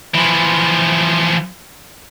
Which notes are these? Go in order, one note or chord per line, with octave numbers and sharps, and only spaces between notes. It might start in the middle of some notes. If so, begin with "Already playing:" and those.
E3 F3